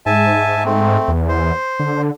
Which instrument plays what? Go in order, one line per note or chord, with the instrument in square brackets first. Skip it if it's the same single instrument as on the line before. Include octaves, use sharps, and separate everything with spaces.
[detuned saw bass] G#2 [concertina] E5 G#5 A5
[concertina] A3 C4
[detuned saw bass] E2
[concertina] C5
[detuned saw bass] D3